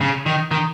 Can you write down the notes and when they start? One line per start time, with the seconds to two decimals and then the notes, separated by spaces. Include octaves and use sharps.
0.01 C#3
0.26 D#3
0.51 D#3